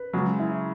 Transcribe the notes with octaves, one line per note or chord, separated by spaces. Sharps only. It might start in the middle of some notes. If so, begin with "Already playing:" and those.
Already playing: B4
C#3 F#3 G#3
E4